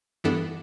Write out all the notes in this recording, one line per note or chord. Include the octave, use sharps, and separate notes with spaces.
G2 E3 B3 D4 A4